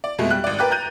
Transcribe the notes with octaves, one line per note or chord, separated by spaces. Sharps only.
D5
F2 B2 G#3 A3
G3 F#6
G#1 D5
A#4 B4 G5 D6 F#6 A6
A#5 F#6 G6 D#7